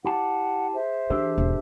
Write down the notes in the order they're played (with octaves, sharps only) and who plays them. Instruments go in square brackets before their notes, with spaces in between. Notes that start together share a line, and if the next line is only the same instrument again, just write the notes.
[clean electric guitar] E4 G4 A5 [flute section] F#5
[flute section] G#4 C5 E5
[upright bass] E3 [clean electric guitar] D4 G4 A4
[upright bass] E1 G#2